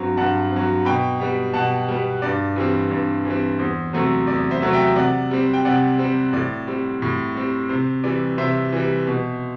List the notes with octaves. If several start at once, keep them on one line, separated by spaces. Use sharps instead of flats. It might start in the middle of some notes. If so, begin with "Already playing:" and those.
Already playing: G2 F#3 C4
G2 F#5 A5
C4
F#3
B2 G5 B5
G3 B3
B2 F#5 A5
G3 B3
G2 D5
E3 G3 C4
G2
E3 G3 C4
E2 C5
C3 F#3 A3 C4
E2 D5
C5 E5
C3 F#3 A3 C4
E5 G5
C3 D5 F#5
G3 C4
G5
C3 D5 F#5
G3 C4
A2 D5
G3 C4
A2
G3 C4
C3 C5
E3 G3 D5
C3 C5 E5
E3 G3
B2